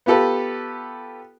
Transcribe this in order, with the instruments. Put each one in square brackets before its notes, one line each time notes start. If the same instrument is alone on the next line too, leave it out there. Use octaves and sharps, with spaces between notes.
[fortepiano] B3 F4 G4 A4 B4